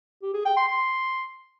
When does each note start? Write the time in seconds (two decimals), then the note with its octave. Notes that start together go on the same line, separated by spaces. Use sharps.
0.23 G4
0.34 G#4
0.45 G5
0.57 C6
0.68 C6